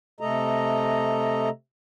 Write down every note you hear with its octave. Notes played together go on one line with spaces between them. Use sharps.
C3 A3 A4 D#5 A#5